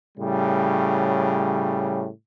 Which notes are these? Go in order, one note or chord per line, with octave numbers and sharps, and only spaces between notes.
A2 C#3 G3